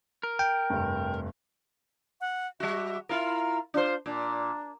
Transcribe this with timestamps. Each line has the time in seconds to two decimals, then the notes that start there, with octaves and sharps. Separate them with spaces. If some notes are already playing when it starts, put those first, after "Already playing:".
0.23 A#4
0.39 G5
0.70 F1 G2
2.21 F#5
2.60 G3 F#4 E5
3.09 E4 F4 A#4 F5
3.74 D4 F4 C5
4.06 A#2 D4